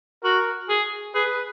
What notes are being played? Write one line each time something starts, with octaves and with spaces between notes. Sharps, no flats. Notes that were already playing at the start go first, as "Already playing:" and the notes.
F#4 A#4
G#4
G#4 B4